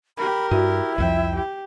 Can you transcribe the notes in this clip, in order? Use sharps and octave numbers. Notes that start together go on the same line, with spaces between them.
G4 A#4 B5
G2 E4 F#4
C2 F2 F3 E5 G5
G4